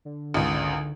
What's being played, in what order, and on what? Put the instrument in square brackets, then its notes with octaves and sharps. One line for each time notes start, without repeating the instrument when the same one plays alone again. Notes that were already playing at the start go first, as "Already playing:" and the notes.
[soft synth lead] D3
[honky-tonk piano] G#1 C#2